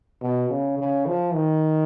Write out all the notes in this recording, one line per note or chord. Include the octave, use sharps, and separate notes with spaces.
B2
C#3
C#3
F3
D#3